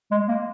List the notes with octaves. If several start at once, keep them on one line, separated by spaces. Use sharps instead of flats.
G#3
A#3